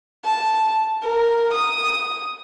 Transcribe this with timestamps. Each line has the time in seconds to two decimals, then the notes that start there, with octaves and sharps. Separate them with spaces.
0.25 A5
1.03 A#4
1.53 D#6